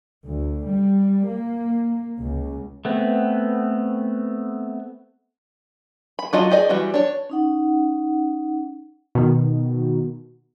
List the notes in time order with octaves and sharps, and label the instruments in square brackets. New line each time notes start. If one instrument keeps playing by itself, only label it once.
[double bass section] D2
G3
A#3
C#2
[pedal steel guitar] A3 B3 C4
[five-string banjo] B5
F#3 F4 D#5 A5
G4 G#4 D5 D#5
E3 G3 F#4
D4 C#5
[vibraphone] C#4 D#4 F#5
[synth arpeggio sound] B2 D#3